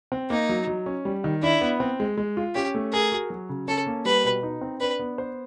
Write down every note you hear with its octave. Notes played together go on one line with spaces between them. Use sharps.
C4
A#3 D#4
F#3
F#3
C#4
G3
D#3
D4 E4
B3
C4
G#3
G#3
F4
C#4 G4
A3
G#4 A#4
F#4
F#3
C#3
C#4 A4
A#3
G3 B4
B2
D#4
C4
D4 B4
B3
C5